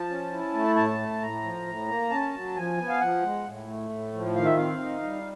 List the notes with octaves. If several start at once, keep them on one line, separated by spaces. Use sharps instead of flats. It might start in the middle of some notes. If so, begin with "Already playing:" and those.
Already playing: F3 A5
C#4
E4
A3
A2 A5
A3
A2 A#5
F3
A2
A#3
C#4 A5
F#3
F3 G#5
B3
F5
F3 F#5
G#3
A2
A3
A2
F3
D#3 F5
E5
C4 F5
D#4
G3